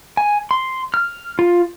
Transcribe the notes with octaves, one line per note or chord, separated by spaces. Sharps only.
G#5
C6
F6
F4